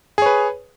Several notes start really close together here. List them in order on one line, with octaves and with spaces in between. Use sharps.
G#4 C#5 B4